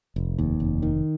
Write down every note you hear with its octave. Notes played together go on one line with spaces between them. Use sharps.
F1
D#2
F1
D#3